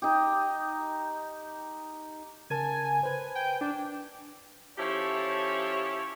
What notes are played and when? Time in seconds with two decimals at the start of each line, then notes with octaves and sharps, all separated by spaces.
0.02 D#4 G4
2.50 C#3 A#4 G#5 A5
3.03 B4 C5
3.35 G5
3.61 D4
4.77 F3 C#4 E4 G4 A4 C#5